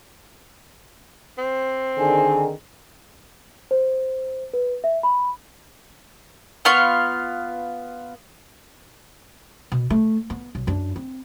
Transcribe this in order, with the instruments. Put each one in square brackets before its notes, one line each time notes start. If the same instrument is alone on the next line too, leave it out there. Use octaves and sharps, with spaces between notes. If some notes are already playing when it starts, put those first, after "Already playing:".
[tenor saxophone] C4
[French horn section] D3 D#3 G#4 [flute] G#5
[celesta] C5
B4
E5
B5
[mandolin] B3 F4 F5 C#6
[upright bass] B2
A3
B3
B1
F#2 D4
C4